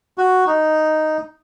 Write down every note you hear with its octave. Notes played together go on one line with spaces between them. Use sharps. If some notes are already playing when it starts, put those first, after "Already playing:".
F#4
D#4